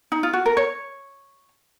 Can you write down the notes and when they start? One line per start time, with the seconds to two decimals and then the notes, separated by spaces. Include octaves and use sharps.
0.12 D#4
0.23 F4
0.33 F#4
0.46 A#4
0.57 C#5